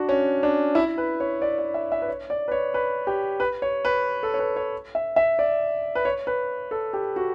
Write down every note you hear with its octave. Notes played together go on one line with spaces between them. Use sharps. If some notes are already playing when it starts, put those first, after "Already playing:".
Already playing: D4 F#4
C#4
D4
E4
B4
C#5
D5
D5
E5
E5
B4
C#5
D5
B4
C#5
B4
G4
B4
C#5
B4
A4
C#5
B4
C#5
E5
E5
D5
B4
C#5
B4
A4
G4
F#4